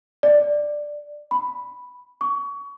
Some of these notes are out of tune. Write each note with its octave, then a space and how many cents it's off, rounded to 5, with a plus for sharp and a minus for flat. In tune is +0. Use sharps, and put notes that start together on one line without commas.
D5 +5
B5 +0
C#6 +25